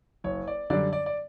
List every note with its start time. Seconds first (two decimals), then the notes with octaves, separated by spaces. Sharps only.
0.24 F#1 C#5
0.48 D5
0.70 F#2 D3 G3 D4 D5
0.93 D5
1.06 D5